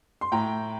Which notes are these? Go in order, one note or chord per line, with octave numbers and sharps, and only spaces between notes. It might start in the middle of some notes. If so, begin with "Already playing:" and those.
C6
A2 G5 A#5